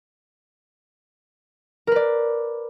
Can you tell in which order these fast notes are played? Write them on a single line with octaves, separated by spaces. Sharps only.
A#4 B4 D5